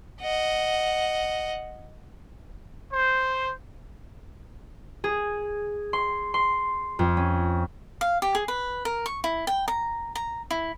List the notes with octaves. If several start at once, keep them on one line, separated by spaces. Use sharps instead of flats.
D#5 F#5
C5
G#4
C6
C6
F2
C#4
F5
G4
G#4
B4
A#4
C#6
E4
G5
A#5
A#5
E4